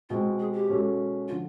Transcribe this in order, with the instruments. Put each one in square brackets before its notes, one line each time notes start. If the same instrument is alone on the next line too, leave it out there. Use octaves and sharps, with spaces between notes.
[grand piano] B2 G#3 C4 [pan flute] F4
[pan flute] G#4
G4
[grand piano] B2 G#3 C#4 F#4 A4
[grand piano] D3 F3 [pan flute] F4